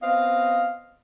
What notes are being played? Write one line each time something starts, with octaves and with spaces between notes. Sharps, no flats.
B3 C4 D#5 F5